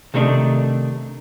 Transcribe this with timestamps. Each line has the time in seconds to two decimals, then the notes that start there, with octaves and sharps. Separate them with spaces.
0.14 C3 D#3 A3 D4 D#4